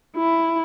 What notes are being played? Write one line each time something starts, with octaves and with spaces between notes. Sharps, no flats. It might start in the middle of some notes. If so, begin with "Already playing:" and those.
E4